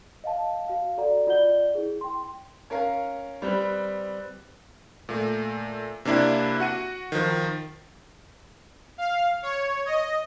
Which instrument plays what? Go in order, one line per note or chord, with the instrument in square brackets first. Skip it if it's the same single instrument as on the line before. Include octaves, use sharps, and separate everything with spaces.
[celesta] D#5 F5 A5
F#4 F5
F#4 A4 D5 F#5 A#5
F4 D5 D#5 F#5 G6 G7
E4 G#4
G5 C6
[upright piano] C#4 A#4 F5
G3 C4 B4
[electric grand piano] A#2 A3
C3 A#3 D4 E4 G4
F#4 F#5 D#7
D#3 F3
[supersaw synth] F5
C#5
D#5